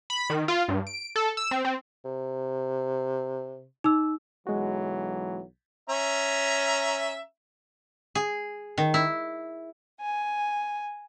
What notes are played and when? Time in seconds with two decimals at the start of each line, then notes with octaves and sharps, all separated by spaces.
0.10 B5
0.30 D#3
0.48 F4
0.68 G2
0.87 D7
1.16 A4
1.37 E6
1.51 C4
1.65 C4
2.05 C3
3.84 D#4 E6
4.47 B1 E3 F#3 G#3 F#4
5.90 C#4 E5 A#5
8.15 G#4
8.78 D#3
8.94 E4
10.00 G#5